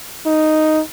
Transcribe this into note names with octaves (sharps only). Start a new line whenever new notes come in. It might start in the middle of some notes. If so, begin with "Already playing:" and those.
D#4